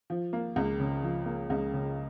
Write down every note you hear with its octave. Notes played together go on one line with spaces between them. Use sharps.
F3
A#3
C#2
C#3
F3
A#3
C#2
C#3